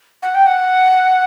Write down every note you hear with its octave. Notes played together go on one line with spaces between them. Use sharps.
F#5
G5
F#5